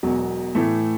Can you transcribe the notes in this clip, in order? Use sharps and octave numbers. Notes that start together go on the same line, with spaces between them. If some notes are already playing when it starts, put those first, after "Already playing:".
E1 E2 B2 F#3
A2 E3 A3